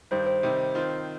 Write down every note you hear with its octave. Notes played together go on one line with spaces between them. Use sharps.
G2 D#3 G3 C5
C5
C3 D#3 G3
D#3 C4 F4